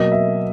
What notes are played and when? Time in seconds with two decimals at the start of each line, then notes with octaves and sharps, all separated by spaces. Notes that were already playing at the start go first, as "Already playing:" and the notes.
Already playing: B2 F#3 A#3 D#5
0.12 E5